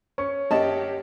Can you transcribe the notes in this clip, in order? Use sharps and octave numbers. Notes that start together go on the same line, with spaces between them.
C#4 C#6
F#2 G4 D#5 A5